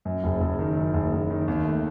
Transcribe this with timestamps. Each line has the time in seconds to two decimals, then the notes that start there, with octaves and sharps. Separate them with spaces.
0.05 F#2
0.24 F#1
0.41 F#1
0.59 D#3
0.77 F#2
0.94 F#1
1.12 F#1
1.30 D#3
1.48 D#2
1.65 A3